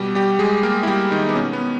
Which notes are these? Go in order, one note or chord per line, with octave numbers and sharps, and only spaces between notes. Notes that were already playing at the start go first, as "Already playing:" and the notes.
Already playing: B2 G3 G4
G3 G4
G#3 G#4
A#3 A#4
E4
G3 G4
D#3 D#4
B3
B2 C#4
B3